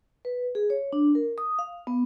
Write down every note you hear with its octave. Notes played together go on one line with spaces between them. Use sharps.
B4
G#4
C#5
D4
A#4
D#6
F5
B3